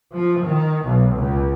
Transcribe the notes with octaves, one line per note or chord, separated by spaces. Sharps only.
F3
D#3
B1
C#2